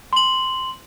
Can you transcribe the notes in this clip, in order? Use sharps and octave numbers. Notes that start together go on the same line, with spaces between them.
C6 F#7